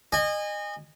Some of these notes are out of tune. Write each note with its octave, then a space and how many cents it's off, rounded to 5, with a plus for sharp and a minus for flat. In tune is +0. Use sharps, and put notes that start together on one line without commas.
D#5 -25 G#5 -25